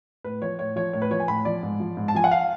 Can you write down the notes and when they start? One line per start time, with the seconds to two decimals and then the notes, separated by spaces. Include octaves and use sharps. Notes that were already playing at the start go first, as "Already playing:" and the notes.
0.24 A2 B4
0.42 F3 C#5
0.59 A2 C#5
0.76 F3 C#5
0.93 A2 C#5
1.02 B4
1.11 F3 C#5
1.20 G#5
1.28 A2 B5
1.45 F3 D5
1.63 G#2
1.80 F3
1.97 G#2
2.08 A5
2.15 F3 G#5
2.24 F#5
2.31 F5